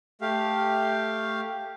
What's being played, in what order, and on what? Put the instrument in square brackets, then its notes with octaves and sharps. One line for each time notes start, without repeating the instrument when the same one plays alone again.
[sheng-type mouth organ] A3 G4 F5